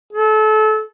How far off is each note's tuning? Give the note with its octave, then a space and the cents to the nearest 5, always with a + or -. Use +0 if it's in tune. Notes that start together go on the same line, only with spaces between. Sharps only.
A4 -30